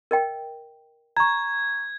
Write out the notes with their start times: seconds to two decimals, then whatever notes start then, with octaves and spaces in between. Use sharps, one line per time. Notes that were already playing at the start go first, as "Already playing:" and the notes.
0.11 A#4 D#5 G5
1.17 A#5 C#6 G#6